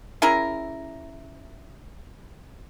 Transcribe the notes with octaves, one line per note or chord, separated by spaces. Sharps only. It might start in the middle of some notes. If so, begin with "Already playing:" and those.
C#4 E4 G#4 A#4